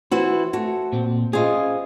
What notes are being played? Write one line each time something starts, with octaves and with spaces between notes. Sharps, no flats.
E3 E4 F#4 C5
A3 F#4
A#2 C4
C#4 F4 G#4 C5 D#5